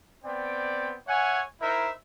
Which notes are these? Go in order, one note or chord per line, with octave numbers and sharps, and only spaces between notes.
B3 C4 D5 G5
C#5 E5 F#5 G#5
D#4 E4 A#4 C5 E5